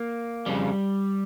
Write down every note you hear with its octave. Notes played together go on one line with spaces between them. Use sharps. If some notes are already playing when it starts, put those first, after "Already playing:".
Already playing: A#3
F2 C#3 G3